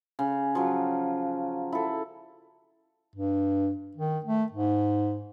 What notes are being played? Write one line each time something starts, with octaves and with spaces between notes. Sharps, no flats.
C#3
F3 F#3
E4 A4
G2
D#3
A3
G#2